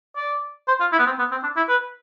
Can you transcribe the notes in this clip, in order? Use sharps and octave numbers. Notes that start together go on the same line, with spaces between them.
D5
C5
F4
E4
B3
C4
B3
C4
D4
E4
B4